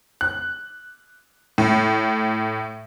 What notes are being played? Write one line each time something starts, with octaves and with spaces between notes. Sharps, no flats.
F#6
A2